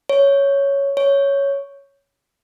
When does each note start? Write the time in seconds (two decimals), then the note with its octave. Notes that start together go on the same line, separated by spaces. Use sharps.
0.09 C#5
0.97 C#5